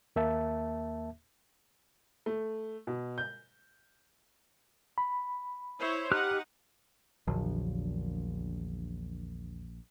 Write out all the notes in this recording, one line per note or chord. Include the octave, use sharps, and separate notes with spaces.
D#2 A#3 E5 A5
A3
B2
G6
B5
E4 C5 C#5
D#4 G4 F#5 F6 F#6
A#1 E2 D3 F#3